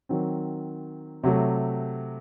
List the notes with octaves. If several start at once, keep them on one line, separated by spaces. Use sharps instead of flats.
D#3 F#3 C4
C3 F#3 A3